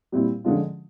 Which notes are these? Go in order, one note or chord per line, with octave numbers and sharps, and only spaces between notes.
A#2 G3 C4 E4
D3 F3 G#3 C#4 F4